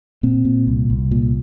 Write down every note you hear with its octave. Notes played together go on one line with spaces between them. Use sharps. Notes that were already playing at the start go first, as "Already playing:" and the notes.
A#2 C4
A#2
C2
C2
A#2